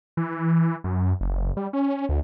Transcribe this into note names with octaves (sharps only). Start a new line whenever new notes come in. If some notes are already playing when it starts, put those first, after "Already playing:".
E3
F#2
F#1
G3
C#4
D2